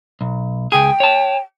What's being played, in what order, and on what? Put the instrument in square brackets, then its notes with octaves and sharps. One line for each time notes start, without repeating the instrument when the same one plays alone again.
[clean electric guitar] B1
[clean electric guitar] C#2 G#4 [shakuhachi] G5
[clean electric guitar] C#5 A5